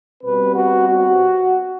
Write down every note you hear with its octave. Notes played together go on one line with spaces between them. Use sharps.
B2 G3 C4 B4
F#4
F#4